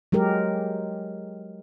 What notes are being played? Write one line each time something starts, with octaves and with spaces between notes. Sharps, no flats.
F#3 G#3 G4 A#4